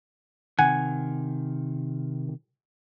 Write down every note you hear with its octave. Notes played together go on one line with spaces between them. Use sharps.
C3 D#3 F#5 G#5